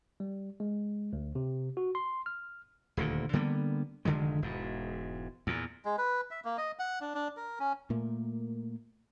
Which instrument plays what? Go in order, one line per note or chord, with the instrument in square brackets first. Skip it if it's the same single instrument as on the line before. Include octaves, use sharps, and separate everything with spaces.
[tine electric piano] G3
G#3
D2
C3
F#4
C6
F6
[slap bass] D#1 D2 A#2
D3 G3 A#3 B3
F1 D3 D#3 G#3
E1 G#2
E2 A#2
[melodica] G#3
B4
E5
A#3
D#5
F#5
D4
D4
A#4
C#4
[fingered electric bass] A#2 A3 A#3